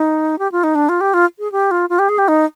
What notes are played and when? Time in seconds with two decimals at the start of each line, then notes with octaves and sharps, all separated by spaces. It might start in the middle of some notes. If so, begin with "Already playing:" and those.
Already playing: D#4
0.39 G4
0.52 F4
0.64 D#4
0.75 D4
0.89 F4
1.01 G4
1.14 F4
1.39 G#4
1.52 G4
1.71 F4
1.90 F4
1.99 G4
2.09 G#4
2.18 G4
2.28 D#4